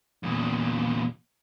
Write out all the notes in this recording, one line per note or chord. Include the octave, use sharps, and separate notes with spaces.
E2 A#2